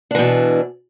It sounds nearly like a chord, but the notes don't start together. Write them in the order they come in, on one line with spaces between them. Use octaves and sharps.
D4 E3 B2